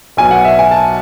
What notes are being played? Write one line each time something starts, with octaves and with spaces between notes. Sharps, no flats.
B1 B2 G#5
F#5
E5
G#5
A5